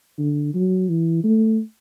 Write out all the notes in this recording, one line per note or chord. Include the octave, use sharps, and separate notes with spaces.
D3
F#3
E3
A3